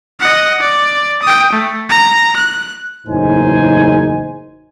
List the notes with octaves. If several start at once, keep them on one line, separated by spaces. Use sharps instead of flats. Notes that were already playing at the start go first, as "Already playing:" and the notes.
D#5 F#5
D5
G5 D#6
A3
A#5
F#6
F#1 E2 A2 D#4 C5 G#5